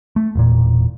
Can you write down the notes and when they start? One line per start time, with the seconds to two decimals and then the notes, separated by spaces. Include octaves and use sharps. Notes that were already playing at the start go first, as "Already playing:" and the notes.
0.16 A3
0.35 E1 A#2